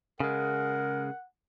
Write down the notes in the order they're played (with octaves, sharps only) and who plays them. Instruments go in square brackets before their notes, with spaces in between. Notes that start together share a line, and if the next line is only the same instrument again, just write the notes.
[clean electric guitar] C#3 G#3 [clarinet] A#4 [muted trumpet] F#5